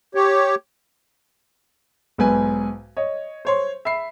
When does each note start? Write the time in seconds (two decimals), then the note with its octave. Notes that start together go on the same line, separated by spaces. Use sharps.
0.15 G4 C#5
2.18 B1 G#2 B4 G#5
2.97 C#5 D#5
3.45 C5 C#5 C6
3.85 E5 B5 C7